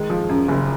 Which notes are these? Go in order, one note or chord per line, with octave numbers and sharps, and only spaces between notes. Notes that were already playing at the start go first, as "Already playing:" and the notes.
Already playing: D#3 G#3
F3
F#2
F#1